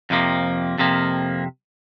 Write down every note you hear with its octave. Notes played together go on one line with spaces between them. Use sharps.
F2 C3 F3 A#3
F2 C3 F3 A#3